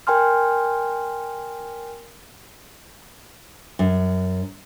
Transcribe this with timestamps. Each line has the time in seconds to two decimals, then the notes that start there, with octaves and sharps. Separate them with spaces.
0.07 A#4 G5 G#5 C6 F6
3.79 F#2